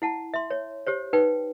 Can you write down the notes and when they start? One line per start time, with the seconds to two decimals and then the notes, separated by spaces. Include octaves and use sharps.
0.02 E4 F#5 A5
0.34 E5 C6
0.51 C#5
0.87 G4 C5 C#5
1.13 D#4 B4 G5